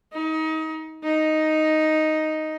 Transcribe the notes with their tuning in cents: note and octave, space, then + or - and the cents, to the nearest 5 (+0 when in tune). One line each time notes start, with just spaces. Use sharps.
D#4 +30
D#4 +0